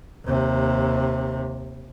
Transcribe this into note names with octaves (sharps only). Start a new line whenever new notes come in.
D#2 C3